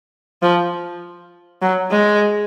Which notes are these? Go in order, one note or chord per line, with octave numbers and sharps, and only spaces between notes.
F3
F#3
G#3